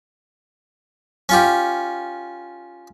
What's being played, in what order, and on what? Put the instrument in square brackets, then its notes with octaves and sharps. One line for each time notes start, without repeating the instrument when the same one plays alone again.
[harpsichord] C#4 F4 G4